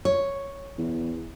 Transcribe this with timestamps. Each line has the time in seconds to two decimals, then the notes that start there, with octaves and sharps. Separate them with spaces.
0.05 C#5
0.78 E2